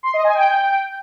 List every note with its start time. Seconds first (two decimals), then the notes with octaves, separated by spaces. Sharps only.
0.03 C6
0.14 D#5
0.24 G#5
0.35 G5